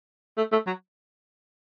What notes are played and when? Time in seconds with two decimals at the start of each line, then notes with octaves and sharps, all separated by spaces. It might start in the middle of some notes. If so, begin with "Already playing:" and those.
0.37 A3
0.52 A3
0.66 F#3